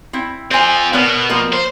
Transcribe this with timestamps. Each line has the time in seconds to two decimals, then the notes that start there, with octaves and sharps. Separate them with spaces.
0.13 C4 E4
0.51 C4 F4 C5 G#5
0.93 B2 B3 A#4 C#5
1.30 F3 A#3 A#4
1.53 C5